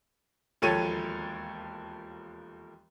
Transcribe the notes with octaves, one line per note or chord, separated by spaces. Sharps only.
E1 D#2 F3 A4 C#5 D#7